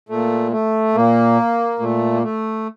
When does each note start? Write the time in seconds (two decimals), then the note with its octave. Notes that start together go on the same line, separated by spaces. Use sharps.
0.09 A#2 A3
0.52 A3
0.95 A#2 A#3
1.80 A#2 A3
2.14 A#3
2.23 A3